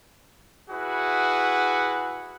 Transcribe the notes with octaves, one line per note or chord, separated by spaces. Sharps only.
E4 F#4 G#4 B4